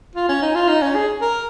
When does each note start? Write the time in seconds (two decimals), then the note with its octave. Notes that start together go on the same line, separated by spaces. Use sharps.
0.16 F4
0.29 C#4
0.42 D#4
0.55 F4
0.68 D#4
0.82 C#4
0.95 G#4
1.21 A#4